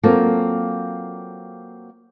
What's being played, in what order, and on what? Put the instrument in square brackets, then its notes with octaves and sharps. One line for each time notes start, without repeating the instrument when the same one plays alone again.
[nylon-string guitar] F#3 A#3 C4 F4 A4 A5